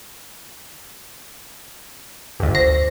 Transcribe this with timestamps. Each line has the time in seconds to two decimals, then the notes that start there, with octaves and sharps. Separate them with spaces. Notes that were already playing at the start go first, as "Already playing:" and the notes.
2.40 G1 D2
2.55 C5 A#6